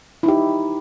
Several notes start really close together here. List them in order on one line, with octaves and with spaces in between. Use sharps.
E4 D#4 G4